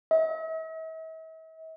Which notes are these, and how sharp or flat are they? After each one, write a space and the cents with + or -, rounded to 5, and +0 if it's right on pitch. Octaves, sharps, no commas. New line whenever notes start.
E5 -45